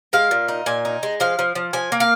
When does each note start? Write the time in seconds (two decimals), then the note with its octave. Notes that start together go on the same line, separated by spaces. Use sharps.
0.13 G#3 F5
0.31 A#2
0.48 D#4
0.66 A#2 G#5
0.85 D#4
1.03 G#3
1.20 F3 F5
1.39 F3
1.55 F3
1.73 F3 G#5
1.92 A#3
2.00 F5